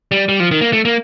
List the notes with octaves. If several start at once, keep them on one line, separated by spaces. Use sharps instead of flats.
G3
G3
F3
D#3
A#3
A3
A#3